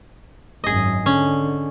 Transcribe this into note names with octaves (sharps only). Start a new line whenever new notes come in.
G#1 F#2 G#4 D#5
D3 C#4